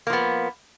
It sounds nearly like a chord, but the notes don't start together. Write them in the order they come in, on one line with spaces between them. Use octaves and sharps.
A#3 F3 B3